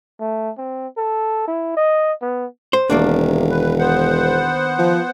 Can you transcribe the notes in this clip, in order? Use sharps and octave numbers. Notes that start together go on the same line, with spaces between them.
A3
C4
A4
E4
D#5
B3
C5
E1 C3 D#3 A#3 D4
B4
B3 C5 F#5
F3